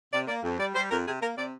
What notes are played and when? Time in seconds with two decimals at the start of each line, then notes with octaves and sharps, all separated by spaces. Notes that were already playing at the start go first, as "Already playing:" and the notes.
0.12 C3 D5
0.27 A#3 D5
0.43 F2
0.59 G3 D5
0.75 G3 C5
0.90 F2 A#4
1.06 C3 G#4
1.22 A#3 A#4
1.37 C3 D5